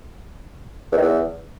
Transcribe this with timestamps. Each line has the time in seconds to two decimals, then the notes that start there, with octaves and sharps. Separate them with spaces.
0.92 E2
0.97 D#3
1.02 E2